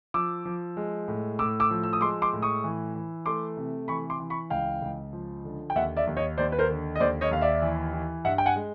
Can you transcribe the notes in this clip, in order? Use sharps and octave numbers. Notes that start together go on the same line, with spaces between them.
F3 D6 E6
F3
G#3
A2
A2 D6 E6
D6 E6
F3
E6
D#6
G#3 C6 D6
C6 D6
A2
C#6 D#6
E3
E3
A3 C6 D6
C3
E3 B5 C#6
C6 D6
E3
B5 C#6
C#2 F5 G5
C#2
F3
D3
G5
D#2 E5 F#5
D5 E5
D#2
C#5 D#5
D#2 C5 D5
B4
A#4 C5
D3
D#5
D#2 C5 D5
C#5 D#5
D#2 F5
D5 E5
E3
E3
G2 E5 F#5
G5
F#5 G#5
G#3